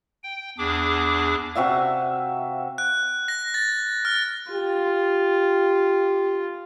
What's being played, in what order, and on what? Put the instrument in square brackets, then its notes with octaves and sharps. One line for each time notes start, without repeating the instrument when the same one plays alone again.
[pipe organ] G5
E2 D4 G#4 D6
[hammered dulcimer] C3 F#4 E5 F5
[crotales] F#6
A#6
A6
F6
[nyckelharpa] F4 [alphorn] G4